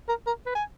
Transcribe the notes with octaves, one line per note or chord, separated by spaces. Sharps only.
A#4
A#4
B4
G#5